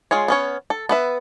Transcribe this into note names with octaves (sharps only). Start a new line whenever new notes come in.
G#3 F4 G#4 C#5
B3 C#4 C#5
A4
B3 B4 E5